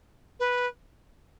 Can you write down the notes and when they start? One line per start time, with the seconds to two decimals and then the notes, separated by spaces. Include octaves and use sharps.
0.40 B4